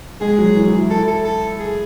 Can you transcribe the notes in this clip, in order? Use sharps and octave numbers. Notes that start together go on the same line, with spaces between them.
G#3 G#4
F#3
E3
F#3
E4
E4 A4
A4
A4
G#4